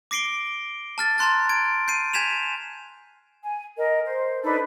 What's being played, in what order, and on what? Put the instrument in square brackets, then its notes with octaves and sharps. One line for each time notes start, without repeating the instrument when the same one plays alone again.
[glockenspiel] D6 A#6 C7 D7 G7
A5 F6 A6
A5 A#5 C6 F#6 A6
G#6 D7
G6 C7 D#7
G#5 G6 G#6 B6 E7 F7
[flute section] G#5
A#4 D#5
C5
D4 D#4 A4 B4